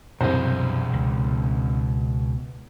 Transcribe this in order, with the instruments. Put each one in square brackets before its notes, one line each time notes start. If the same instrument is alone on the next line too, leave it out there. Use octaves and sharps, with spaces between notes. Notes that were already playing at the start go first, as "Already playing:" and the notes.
[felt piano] C2 C5 [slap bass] F#2 [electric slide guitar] B2 G#4
[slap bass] C#2